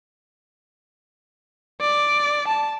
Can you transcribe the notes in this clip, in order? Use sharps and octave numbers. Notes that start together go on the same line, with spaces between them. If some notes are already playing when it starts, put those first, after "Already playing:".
D5
A5